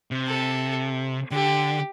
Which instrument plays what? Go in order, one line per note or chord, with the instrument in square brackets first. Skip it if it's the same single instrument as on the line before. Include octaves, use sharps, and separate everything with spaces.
[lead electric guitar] C3
[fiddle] A4
[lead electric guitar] D3 [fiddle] G4